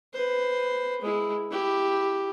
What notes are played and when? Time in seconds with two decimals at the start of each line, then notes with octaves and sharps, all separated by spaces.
0.13 B4 C5
1.01 G#3 E4
1.51 E4 G4